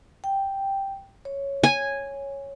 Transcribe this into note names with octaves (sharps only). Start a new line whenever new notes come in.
G5
C#5
G#5